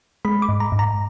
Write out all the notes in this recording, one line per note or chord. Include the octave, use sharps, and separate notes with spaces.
G#3 B5
D6
G#2
A#5
G#2
A#5